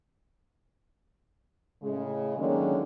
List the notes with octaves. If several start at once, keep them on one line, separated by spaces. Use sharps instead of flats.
A2 C#3 G#3
D3 D#3 F#3 G#3 A#3 C#4